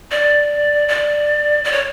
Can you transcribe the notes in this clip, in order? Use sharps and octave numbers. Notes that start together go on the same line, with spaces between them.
D5
D5
D5
C#5